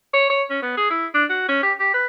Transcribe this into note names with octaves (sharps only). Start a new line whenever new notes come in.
C#5
C#5
C#4
B3
G#4
E4
D4
F#4
C#4
G4
G4
B4